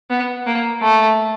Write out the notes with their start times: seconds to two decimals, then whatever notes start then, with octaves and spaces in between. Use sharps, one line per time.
0.10 B3
0.46 A#3
0.82 A3